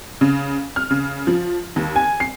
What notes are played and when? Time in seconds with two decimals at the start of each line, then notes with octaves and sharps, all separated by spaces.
0.21 C#3
0.76 F6
0.91 C#3
1.27 F3
1.76 D#2
1.96 G#5
2.20 C7